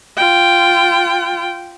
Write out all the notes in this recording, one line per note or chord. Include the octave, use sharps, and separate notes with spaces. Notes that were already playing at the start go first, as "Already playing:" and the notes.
F4 G5